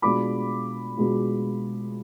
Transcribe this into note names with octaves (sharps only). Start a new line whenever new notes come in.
B2 G#3 D4 F4 B5 D6
B2 G#3 D4 F4